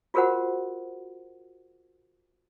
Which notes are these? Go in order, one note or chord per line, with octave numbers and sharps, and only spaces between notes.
F4 F#4 G#4 A#4 C5 F#5